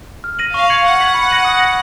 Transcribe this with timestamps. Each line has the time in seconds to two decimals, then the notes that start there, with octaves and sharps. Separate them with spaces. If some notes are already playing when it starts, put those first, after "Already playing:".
0.24 F6
0.39 A#6 D#7 F#7
0.54 F5 C#6
0.69 G#6 C#7 F#7
0.84 F#5 C#6
1.00 G#6 B6 F#7
1.14 B5
1.30 F#6 A#6 D#7 F#7
1.45 D#6
1.60 A#6 C#7 F#7